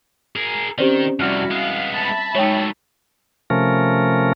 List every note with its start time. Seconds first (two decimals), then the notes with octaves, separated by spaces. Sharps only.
0.36 G#4 A#4
0.78 D#3 C4 C#4 G4 C5 D5
1.20 F2 C3 G3 E4 F#4 D5 F6 F#6
1.51 G#3 B3 F5
1.93 E5 A5 B5
2.35 F#3 G#3 A3 D#4 C#5 G5
3.50 C3 F3 A3 C#4 A#4